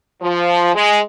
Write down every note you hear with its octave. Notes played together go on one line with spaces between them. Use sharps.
F3
G#3